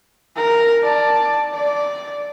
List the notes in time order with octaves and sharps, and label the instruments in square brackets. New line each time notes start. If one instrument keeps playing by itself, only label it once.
[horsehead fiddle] A#4
D5 A5
D5